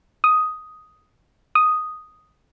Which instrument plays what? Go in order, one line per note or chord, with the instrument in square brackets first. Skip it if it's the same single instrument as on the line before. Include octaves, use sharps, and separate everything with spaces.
[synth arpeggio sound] D#6
D#6